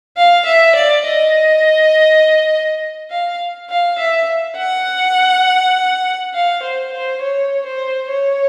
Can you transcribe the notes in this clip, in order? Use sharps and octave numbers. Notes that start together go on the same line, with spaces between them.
F5
E5
D5
D#5
F5
F5
E5
F#5
F5
C5
C5
C#5
C5
C#5